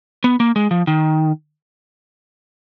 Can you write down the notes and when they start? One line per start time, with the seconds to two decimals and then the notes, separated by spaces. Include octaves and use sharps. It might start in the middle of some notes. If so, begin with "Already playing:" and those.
0.24 B3
0.40 A#3
0.56 G#3
0.71 F3
0.87 D#3